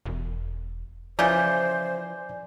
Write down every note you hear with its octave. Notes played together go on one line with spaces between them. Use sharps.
E1
C#3 E3 F3 C5 D5 G#5 G6